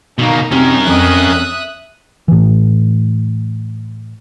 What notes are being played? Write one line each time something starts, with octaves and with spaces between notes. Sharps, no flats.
B2 A#3 D#4
C3 C#4 A#4
F2 E5 D#6 F#6
A2 E3